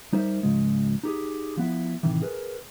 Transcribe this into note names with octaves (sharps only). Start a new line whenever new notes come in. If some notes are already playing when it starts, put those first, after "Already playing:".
G3 D#4 A#4 C5 E5
C#2 G#2 C#3 F3 G#3
D#4 G4 G#4
F3 B3 E4
A2 C3 D#3 E3
G#4 A#4 B4